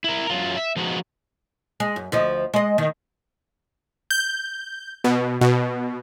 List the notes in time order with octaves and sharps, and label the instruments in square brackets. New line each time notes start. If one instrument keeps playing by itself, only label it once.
[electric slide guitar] E4 A#4
F#2 F#3 F4
E5
F3 G#3 B3 D#4 F#4
[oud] G#3
F#2
D2 F3 D#5
G#3 D#5
D#3
[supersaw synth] G6
B2
B2